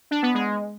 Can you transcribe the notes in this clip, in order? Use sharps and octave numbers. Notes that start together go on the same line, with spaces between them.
D4
B3
G#3